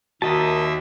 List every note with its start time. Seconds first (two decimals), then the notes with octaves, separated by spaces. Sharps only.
0.22 D#2 F#4 A#4 D#5 E5 A5